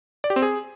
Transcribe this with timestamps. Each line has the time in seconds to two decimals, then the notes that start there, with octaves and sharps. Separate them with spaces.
0.24 D5
0.30 G4
0.36 C4
0.42 G#4